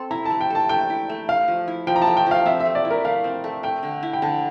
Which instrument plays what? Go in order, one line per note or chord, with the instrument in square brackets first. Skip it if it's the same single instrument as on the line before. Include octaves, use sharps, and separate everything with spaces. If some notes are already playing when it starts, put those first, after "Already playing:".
Already playing: [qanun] C4 A4
[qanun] E4 [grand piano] A#5
[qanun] A3 [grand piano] A5
[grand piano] G5
[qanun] A4 [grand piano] A5
[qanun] A3 [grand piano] G5
[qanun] E4
A3
[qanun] A3 [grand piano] F5
[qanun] F3
E4
[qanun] F3 [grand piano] G5
[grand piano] A#5
A5
[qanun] A3
[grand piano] G5
[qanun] F3 [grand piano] F5
[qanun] C4 [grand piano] E5
[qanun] A3 [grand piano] E5
[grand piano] D5
[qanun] E4
[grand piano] A#4
[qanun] A3 [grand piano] F5
[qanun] C4
A3
[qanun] A3 [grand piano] G5
[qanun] D3
E4
[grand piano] G5
[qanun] D3 [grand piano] A5